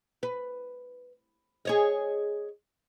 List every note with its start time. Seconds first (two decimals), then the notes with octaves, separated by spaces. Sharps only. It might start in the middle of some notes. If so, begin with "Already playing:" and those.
0.23 B4
1.65 G#4 C#5 D#5